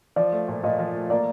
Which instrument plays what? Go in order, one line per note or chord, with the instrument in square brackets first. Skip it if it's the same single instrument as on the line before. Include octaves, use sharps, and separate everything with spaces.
[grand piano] F3 [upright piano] D5
[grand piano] A3
A#2
[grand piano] A#2 [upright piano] D#5
[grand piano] F3
A3
[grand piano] A#3 [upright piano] D5